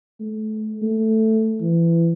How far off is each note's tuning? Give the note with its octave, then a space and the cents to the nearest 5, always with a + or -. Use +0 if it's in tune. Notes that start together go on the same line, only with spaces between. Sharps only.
A3 -30
A3 +5
E3 +25